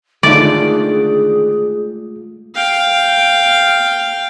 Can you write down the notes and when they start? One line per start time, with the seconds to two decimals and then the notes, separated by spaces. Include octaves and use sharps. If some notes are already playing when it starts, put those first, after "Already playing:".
0.23 D3 D#3 G#3 A3 D4 F4 G#4 D5
2.55 F5 G5